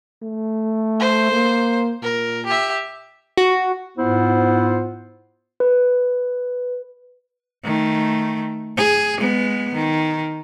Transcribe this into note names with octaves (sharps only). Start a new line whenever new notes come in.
A3
C5
A#3
A#2 A#4
G4 E5
F#4
G#2 B3 E4 F4 C5 F#5
B4
D#3 A3
G#4
G#3 B3
D#3